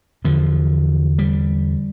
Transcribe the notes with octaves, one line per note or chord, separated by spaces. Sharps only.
E2 D3 F3
G3